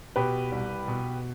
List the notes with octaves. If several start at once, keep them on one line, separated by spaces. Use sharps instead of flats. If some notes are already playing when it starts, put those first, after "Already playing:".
B2 G4 B4
C2
B2